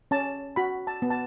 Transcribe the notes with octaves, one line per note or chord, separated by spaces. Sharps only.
C#4 A5
F#4 B5
A5
B3
A5